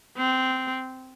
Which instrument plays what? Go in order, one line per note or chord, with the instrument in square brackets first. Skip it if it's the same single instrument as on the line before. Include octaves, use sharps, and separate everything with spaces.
[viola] C4